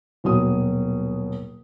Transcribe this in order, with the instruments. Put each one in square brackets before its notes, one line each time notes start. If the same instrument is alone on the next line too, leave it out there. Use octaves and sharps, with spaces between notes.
[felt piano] D#1 B2 F#3 D#6